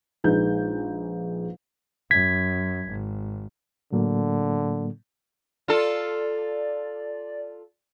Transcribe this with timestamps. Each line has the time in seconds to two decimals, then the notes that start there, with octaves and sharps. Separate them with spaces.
0.24 A#1 G#3 D#4 B4 G6
2.11 F#2 G#6 B6
2.89 G#1
3.92 A2 D3 F#3 A#3
5.68 F4 A4 D5